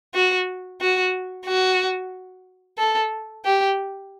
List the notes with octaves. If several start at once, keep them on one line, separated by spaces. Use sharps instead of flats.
F#4
F#4
F#4
A4
G4